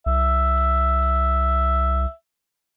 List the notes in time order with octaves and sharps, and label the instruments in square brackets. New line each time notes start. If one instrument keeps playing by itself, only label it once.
[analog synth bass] C2 [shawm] E5